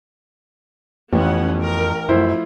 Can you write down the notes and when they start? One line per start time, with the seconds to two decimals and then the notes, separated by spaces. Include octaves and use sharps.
1.13 A1 F2 B3 C#4 F#5
1.59 A#4
2.09 F#2 F3 A3 E4 C5